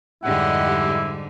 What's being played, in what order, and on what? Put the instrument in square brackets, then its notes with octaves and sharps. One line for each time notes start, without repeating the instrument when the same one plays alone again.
[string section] F2 G4 D#5 [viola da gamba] G#2 D3 G3 [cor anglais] E4 [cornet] F#5